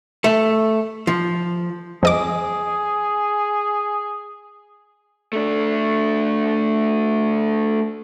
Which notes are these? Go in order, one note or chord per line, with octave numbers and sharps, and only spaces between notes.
A3
F3
F2 G#4 D#5 D6
A3 D4